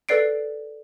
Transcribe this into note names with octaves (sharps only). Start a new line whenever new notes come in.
A4 B4 D5 C7 D7